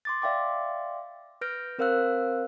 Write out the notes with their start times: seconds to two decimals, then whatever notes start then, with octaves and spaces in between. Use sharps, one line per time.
0.05 C6 D6 A6
0.22 D5 E5 F5 G5 C6 D6
1.41 B4 F6 G6 A#6 D7
1.78 C4 A#4 C5 F5 E6 F#6